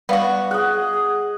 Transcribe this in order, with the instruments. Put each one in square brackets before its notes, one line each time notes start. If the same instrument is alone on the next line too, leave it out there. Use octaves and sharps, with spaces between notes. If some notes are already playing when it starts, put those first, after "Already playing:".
[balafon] G3 D5 F5 [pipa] B3 F#4
[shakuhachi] G#4 [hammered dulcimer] D#5 F#5